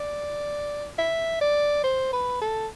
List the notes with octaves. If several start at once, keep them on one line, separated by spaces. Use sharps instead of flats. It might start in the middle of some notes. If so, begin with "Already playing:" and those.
Already playing: D5
E5
D5
C5
B4
A4